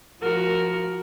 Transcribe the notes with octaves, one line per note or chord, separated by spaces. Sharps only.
F3 F#4 A#4